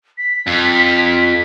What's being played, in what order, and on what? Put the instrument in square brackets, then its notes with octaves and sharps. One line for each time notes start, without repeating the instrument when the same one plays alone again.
[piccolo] B6
[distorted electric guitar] F2